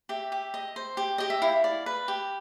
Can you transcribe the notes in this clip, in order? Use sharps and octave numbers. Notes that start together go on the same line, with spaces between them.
G4 E5
G4
D#5
C5
G4
G4 D#5
E5
E4 F5
D5
B4
G4